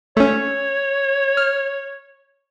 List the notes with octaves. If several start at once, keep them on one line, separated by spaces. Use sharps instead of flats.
A3 C#4 C#5
F6